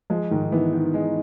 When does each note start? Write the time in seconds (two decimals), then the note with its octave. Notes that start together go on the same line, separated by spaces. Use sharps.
0.10 F3 G#3
0.31 G#2 D#3
0.52 E3 B3
0.73 D#3
0.94 G#3